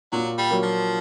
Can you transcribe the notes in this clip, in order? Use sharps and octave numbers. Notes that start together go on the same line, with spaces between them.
A#2 F#3
G3
F#3 A#3
F3